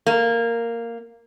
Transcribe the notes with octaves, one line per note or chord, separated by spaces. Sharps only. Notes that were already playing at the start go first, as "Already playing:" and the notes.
A#3